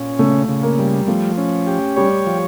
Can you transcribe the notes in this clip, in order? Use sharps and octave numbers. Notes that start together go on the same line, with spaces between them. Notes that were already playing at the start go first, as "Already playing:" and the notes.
Already playing: A#2 C#4
C#3 A3
C#3
A#3
G3
F3 A3
C#4
G4
G3 C#5
F3